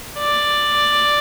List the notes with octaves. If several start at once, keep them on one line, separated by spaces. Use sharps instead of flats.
D5